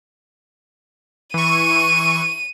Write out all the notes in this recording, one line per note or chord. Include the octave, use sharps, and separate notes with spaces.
E3 C#6 D#7